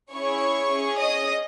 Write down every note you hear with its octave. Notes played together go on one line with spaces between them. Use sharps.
C#4 E4 G#4 C#5 C#6
C#4 G#4
D#5 D#6